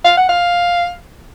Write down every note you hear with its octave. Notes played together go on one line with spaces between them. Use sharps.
F5
F#5
F5